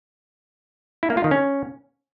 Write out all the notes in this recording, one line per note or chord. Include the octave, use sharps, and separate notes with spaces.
E4
A#3
F4
D#3
C#4